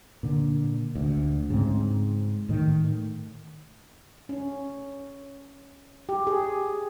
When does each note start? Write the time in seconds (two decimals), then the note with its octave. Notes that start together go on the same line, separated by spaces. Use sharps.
0.23 A#2 D3
0.95 D2
1.50 G#2 C#3 C4
2.49 A2 D#3
4.29 C#4
6.09 G4
6.27 G#4